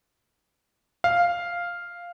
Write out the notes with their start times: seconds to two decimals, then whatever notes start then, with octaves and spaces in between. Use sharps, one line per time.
1.04 F5